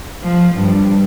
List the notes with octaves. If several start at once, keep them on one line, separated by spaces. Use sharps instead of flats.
F3
G2